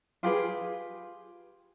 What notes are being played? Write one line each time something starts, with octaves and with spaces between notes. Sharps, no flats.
F4 G4 G#4 B4